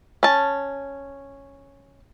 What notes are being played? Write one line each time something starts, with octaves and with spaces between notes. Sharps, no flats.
C#4 A5